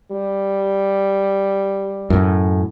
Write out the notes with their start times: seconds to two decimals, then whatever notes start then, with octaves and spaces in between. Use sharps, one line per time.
0.12 G3
2.10 F#2 A2